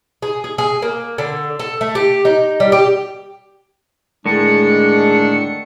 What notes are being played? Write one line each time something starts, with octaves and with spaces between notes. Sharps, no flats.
G#4
G#4
G#4
A#3
D3
A4
A3
G4
D#4
G3
G4
A2 D3 D#3 G#3 D4 C#7